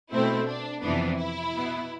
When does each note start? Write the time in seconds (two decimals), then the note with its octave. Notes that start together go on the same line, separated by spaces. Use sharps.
0.11 B2 A3 C4 E4
0.47 D4
0.82 F2 C3 E3 B3 D4
1.18 E4
1.53 B2 B3